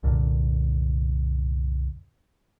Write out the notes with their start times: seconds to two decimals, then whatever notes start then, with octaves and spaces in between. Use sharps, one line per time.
0.03 C2 F#2 A#2 D3